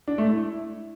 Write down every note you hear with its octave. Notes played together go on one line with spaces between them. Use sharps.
D4
A3
E4